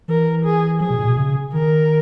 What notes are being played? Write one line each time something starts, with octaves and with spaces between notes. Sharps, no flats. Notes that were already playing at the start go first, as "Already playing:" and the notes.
E3 A#4
G#4
F3 G#4
B2
A#2
B2
C#3
D#3 A#4